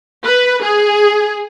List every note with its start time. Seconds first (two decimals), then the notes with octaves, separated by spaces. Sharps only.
0.25 B4
0.63 G#4